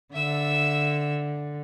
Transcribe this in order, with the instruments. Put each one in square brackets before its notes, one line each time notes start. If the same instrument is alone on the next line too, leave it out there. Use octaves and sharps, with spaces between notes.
[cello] D3 [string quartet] E5 E6